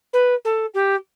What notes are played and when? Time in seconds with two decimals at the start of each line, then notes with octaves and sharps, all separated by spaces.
0.13 B4
0.45 A4
0.74 G4